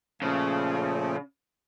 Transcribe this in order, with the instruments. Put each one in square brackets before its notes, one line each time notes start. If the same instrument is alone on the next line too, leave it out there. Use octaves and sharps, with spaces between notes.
[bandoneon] A#2 F3 A3 [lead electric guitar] C#3